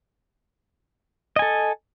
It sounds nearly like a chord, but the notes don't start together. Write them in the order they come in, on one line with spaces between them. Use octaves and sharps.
D#5 G#5 A4